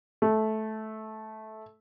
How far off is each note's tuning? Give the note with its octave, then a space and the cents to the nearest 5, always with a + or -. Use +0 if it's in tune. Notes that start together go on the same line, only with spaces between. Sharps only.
A3 -15